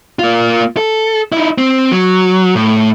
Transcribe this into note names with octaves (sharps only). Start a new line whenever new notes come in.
A#3 F4
A4
D#4 E4
C4
F#3
A2